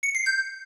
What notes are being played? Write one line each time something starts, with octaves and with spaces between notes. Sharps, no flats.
C#7
C7
G6